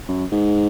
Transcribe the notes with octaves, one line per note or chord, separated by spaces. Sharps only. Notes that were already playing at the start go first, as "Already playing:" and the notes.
F#2
G#2